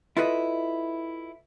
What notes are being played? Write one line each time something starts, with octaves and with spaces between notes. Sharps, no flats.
E4 F4 A4 B4 D#5